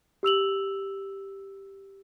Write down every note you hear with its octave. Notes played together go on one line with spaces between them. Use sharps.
G4 E6 F7 F#7